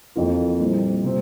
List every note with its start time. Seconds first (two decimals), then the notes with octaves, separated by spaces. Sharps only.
0.16 F2 E3 A#3 F4
0.59 A#2 G3 C4 E4
1.04 C3 G3 C4